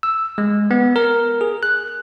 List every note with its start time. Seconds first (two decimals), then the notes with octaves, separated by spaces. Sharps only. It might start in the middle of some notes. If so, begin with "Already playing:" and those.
0.03 E6
0.38 G#3
0.71 B3
0.96 A#4
1.41 G#4
1.63 F#6